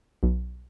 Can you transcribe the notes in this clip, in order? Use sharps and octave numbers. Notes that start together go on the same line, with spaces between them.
B1